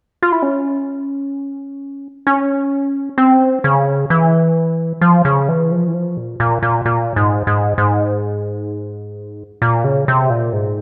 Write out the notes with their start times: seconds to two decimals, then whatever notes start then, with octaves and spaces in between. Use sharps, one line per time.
0.23 F4
0.32 E4
0.42 C#4
2.27 C#4
3.18 C4
3.64 C#3
4.10 E3
5.01 F3
5.25 C#3
5.49 E3
5.71 F3
5.88 E3
5.94 F3
6.17 A#2
6.40 A#2
6.63 A#2
6.85 A#2
7.16 G#2
7.47 G#2
7.78 G#2
9.62 A#2
9.84 C#3
10.08 C3
10.30 A#2
10.53 G#2